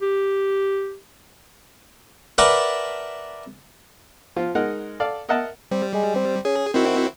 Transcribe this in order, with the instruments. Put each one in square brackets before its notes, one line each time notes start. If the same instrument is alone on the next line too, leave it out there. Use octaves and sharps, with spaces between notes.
[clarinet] G4
[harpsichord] A#4 B4 D5 E5 F#5 A5
[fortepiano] F3 F4
G#3 D#4 A#4 F#5
A4 D5 F5
A#4 D#5 E5 F#5 A5
[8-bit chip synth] G3 [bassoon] C4
[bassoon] G#3
C4
[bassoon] C#4 [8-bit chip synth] G#4
[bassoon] D#3 [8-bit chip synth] C4 E4 F#4